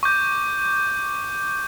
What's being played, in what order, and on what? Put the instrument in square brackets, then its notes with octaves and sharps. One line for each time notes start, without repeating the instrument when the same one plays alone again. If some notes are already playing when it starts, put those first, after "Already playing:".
[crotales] C#6 D6 G6